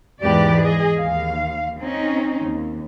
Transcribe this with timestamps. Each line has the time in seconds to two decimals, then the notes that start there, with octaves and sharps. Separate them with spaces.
0.22 E2 G#2 G4 B4 D5
0.62 G#4 D#5
0.98 D#2 F5
1.80 C4 C#4 D#4
2.41 D#2